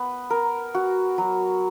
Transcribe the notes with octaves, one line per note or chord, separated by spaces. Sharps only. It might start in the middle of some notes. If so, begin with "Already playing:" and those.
Already playing: B3
A#4
F#4
F#3